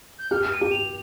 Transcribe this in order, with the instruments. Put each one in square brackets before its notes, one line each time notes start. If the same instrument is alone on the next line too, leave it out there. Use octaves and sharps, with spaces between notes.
[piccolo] G6
[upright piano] G4 [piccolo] F6
[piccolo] D#7
[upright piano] G4
[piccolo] F7